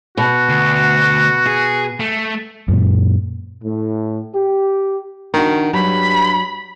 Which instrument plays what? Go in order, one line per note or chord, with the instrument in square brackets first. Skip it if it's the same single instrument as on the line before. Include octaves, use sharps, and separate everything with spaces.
[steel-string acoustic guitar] B2 [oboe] F#4
[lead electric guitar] D2
G#4
A3
[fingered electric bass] F#2 A#2
[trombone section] A2
G4
[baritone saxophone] D#3 [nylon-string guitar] D4 F#4
[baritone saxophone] G2 [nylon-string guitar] F#3 [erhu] B5